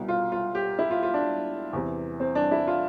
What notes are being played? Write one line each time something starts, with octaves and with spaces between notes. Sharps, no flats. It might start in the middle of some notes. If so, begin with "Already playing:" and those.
Already playing: C2 B2
F4
F4
G4
E4
F4
F4
D4
E2 C3 E3
C4
D4
E4
F4